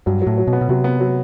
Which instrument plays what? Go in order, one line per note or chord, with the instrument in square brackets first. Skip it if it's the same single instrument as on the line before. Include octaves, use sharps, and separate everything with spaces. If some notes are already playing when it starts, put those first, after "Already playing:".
[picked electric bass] G2 [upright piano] F#3
[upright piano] F#3
[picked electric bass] A2
[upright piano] F#3
[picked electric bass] B2
[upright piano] B3
[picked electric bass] B2
[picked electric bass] C3 [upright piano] F#3
[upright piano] B3
F#3